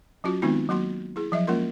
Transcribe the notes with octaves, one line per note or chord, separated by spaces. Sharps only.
F#3 C#4 F4 F#4
D#3 G#3 B3 C4 D#4 F4
F#3 A#3 F#4 C6
E4 G#4
F3 F#3 D#5 E5
G#3 A#3 C#4 F4 A#4 C6